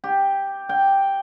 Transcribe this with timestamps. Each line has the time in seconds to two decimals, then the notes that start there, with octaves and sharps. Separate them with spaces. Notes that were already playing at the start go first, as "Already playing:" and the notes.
0.04 G4
0.69 G5